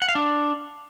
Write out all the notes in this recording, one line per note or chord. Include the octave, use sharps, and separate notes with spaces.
F#5
F5
D4